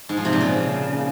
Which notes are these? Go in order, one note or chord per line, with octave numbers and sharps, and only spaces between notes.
G#2
F3
C3
A#2
C#3